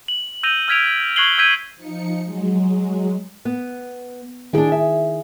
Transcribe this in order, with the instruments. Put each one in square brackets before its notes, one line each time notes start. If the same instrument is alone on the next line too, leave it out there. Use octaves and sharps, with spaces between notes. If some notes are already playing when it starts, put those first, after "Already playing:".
[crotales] F#7
E6 G6 A#6 D#7 F7 G7
E6 F6 G#6 B6 D7 F7
C#6 F#6 G#6 C7 F#7 G7
E6 G6 G#6 B6 D#7
[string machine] F3 D#4 C#7
F#3 G#3
[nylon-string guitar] B3
[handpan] D#3 E4 G#4 [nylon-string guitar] D4 G5
[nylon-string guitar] E5